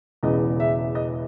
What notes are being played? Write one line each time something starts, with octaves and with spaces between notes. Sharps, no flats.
E1 E2 C#3 E3 D#5
E5
D#5